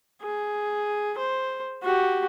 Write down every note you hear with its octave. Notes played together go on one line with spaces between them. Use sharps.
G#4
C5
F#4 G4